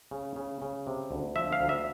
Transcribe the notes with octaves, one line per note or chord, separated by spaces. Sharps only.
C#3
C#3
C#3
C3
D2
F3 E5
F5
D2
E5